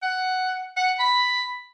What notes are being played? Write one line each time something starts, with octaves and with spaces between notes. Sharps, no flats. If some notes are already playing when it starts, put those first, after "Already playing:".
F#5
F#5
B5